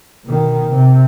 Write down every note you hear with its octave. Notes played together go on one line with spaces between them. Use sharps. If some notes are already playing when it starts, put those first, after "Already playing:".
B2 D#3
C3